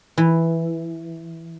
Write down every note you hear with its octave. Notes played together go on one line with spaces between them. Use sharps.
E3